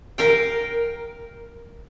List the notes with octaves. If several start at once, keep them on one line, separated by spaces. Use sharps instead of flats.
A#4 F5 G5